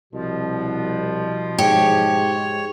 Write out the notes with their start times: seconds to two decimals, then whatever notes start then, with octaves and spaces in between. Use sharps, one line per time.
0.14 C2 B2 F3
1.59 G#2 G4 C#5